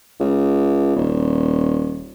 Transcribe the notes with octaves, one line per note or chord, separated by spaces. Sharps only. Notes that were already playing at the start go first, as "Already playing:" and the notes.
C#2
D#1